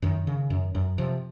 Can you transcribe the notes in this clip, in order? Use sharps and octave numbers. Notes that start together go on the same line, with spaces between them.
F#2 D#3
C#3
F#2
F#2
C3 F3